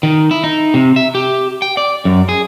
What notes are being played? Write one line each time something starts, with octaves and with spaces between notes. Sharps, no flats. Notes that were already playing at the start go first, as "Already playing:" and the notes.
D#3
E4
D#4
C3
E5
G4
G5
D5
F#2
G#4